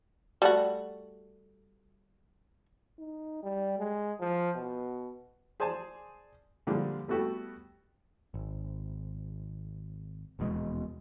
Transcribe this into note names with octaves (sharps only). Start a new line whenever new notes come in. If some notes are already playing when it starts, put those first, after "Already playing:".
G3 A3 F#4
D#4
G3
G#3
F3
B2
G#4 C5 D5 G#5 A5
A#2 D3 F3 G3 G#3
G3 A3 B3 F#4 G4 A4
G#1
D#1 E2 B2 G#3